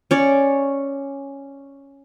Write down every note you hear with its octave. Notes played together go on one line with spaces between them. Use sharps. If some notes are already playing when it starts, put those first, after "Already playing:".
C#4 C#5 D5